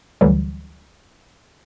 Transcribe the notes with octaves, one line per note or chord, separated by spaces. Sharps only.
D2 D3 E3 F#3 G3